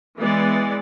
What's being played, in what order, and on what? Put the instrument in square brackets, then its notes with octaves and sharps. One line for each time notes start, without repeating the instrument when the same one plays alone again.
[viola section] E3 G#3 B3 D5